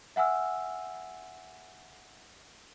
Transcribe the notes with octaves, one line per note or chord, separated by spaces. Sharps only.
E5 F#5 G#5 E6 F6